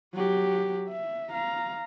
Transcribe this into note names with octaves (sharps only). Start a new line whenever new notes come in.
F#3 G4
E5
F5 A#5